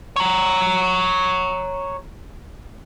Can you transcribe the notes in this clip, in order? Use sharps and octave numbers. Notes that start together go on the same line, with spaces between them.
C#5 A#5